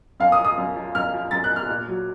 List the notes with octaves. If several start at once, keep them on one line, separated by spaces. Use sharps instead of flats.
F#2 F5
D#6
F3
D#6
F#2
F3
F#2 F6
F3
F#2 A6
F#6
F3
F6
A#2
F#3